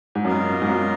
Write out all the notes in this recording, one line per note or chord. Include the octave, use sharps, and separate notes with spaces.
G#2
F#2 B2 A#3 F4 A#4 D#5
G#2
F#2